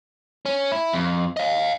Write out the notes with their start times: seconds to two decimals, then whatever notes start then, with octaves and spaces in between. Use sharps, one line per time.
0.45 C#4
0.72 E4
0.93 F2
1.37 D#5 F5